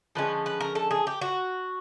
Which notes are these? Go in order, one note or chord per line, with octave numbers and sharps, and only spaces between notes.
D3 F3 G#3 C#4 B4
B4
A#4
A4
G#4
G4
F#4